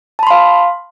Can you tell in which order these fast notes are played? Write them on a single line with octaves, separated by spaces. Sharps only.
A5 B5 C6 F5